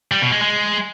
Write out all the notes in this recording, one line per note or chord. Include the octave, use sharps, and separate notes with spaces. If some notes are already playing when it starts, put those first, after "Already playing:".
G3
B2
G#3
G#3